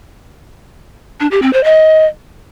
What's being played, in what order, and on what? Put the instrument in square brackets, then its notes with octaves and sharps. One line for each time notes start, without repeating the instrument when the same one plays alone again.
[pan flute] D4
G4
C4
C5
D#5